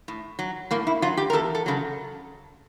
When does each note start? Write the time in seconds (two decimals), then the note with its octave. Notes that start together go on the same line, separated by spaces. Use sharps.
0.08 A2
0.39 F#3
0.71 A2 A#3
0.87 E4
1.02 F#3 F4
1.17 G4
1.30 A#4
1.33 E2 A4
1.55 A4
1.66 C#3 F#3 A4